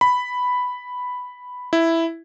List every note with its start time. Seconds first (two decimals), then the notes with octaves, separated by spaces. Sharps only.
0.01 B5
1.73 E4